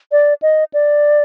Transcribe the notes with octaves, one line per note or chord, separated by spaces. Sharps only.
D5
D#5
D5